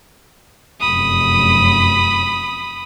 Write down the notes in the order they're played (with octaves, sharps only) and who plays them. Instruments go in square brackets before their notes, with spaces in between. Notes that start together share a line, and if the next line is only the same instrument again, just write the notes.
[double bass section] F1 F#2 [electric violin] B5 D#6